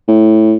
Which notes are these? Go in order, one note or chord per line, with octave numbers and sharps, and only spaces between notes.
A2